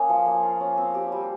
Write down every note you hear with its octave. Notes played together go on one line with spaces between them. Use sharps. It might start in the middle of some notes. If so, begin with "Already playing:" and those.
Already playing: A#3 C#4 G#4
F3
A#3
F4
C#4
C4
G4
G3